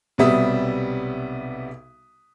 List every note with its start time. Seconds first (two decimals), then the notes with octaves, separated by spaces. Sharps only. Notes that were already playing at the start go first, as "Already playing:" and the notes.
0.18 B1 C3 G3 B3 E5 D#6